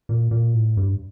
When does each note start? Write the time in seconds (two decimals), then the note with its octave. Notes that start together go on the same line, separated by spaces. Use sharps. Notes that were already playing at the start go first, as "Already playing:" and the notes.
0.09 A#2
0.31 A#2
0.54 A2
0.77 G2